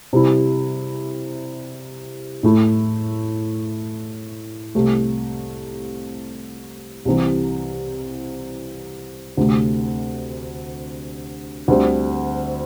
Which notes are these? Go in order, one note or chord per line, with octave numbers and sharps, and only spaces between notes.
C3 G3 E4
A2 A3 E4
C2 C3 A3
C2 C3 E3
D2 C3 A3 C4
D2 D3 G3 C4